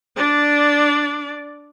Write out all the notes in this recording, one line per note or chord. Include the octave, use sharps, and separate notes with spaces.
D4 D5